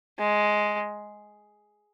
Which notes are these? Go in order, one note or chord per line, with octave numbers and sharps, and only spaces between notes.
G#3